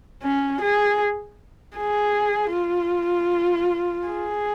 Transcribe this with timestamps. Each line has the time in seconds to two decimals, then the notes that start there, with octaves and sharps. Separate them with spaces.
0.23 C#4
0.61 G#4
1.77 G#4
2.53 F4
4.07 G#4